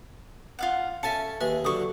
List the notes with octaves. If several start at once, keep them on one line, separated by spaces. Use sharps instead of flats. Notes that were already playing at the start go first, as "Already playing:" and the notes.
F4 F5 F#5
C#4 A4 E5 G#5 A5 A6 C#7
D#2 G#4 B4 E5
D3 F#3 C#6 D#6